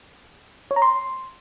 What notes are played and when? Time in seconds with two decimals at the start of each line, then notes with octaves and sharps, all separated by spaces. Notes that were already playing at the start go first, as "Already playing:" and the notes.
0.71 C#5
0.76 A#5
0.82 C6